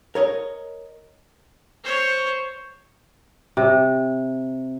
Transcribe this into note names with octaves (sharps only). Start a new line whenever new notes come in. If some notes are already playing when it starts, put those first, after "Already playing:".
A#4 C#5 D#5
C5 C#5
C3